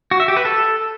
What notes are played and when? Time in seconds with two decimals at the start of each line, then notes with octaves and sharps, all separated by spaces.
0.11 F#4
0.20 E5
0.28 G4
0.37 B4
0.45 A4